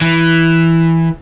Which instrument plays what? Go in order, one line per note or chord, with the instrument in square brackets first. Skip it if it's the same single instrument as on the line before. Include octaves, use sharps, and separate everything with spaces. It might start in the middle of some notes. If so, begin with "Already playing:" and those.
[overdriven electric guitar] E3